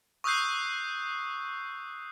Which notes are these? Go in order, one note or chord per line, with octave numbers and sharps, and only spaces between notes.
C#6 D#6 E6 F#6 G6 C7